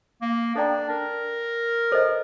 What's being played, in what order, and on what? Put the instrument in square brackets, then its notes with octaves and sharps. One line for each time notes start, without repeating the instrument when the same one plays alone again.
[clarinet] A#3
[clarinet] D4 [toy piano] A4 D5 G5 A#5
[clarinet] A#4
[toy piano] A4 C5 D#5